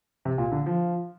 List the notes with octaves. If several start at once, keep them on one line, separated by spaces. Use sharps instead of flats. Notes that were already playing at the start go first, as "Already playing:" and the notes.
C3
A#2
D3
F3